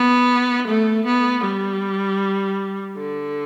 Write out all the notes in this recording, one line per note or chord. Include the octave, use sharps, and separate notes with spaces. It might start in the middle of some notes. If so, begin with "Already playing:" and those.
Already playing: B3
A3
B3
G3
D3